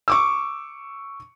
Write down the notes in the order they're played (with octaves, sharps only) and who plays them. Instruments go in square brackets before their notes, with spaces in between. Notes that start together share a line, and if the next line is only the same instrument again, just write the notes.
[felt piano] C#6 D6 E6